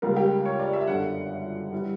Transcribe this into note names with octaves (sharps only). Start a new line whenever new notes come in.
C#2 C#3 G3 A#3 A#4
G4
C#5
D5
E5
G1 F#2 D3 F#5
E3 G3